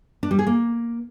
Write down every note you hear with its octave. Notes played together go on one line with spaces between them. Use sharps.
D4
G3
G#4
A#3